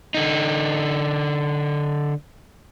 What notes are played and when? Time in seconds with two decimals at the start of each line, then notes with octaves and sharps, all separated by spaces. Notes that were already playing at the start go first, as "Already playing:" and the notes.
0.14 D3 D#4